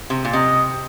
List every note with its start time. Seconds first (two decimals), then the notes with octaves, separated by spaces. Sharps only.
0.10 C3
0.25 A#2
0.33 C3 D#5